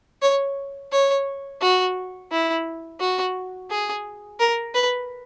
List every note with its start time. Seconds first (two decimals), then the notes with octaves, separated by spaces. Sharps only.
0.22 C#5
0.92 C#5
1.61 F#4
2.31 E4
3.00 F#4
3.70 G#4
4.40 A#4
4.75 B4